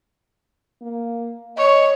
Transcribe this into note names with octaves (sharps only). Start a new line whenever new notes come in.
A#3
C#5 D#5